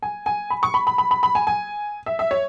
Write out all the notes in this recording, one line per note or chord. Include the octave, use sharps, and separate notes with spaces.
G#5
G#5
B5
C#6
B5
B5
B5
B5
B5
G#5
G#5
E5
E5
C#5